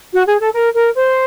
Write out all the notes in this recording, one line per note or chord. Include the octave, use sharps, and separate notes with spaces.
F#4
G#4
A4
A#4
A#4
C5